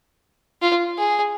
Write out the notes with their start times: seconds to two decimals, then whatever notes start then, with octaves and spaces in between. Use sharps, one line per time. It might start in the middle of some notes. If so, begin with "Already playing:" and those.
0.62 F4
0.98 G#4